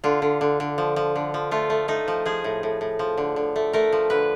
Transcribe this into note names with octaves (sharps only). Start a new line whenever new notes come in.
D3 F4
D3
D3
D3
F3
F3
D3
F3
A3 F4
A3
A3 D#4
F3
F3 G#4
A2
A2
A2
F3
D3
D3
A3
A3 A#4
F3
D3 B4